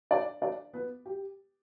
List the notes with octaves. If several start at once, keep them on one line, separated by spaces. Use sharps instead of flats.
D4 D5
D4 D5
B3 B4
G4